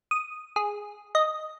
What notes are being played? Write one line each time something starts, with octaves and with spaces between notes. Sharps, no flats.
D#6
G#4
D#5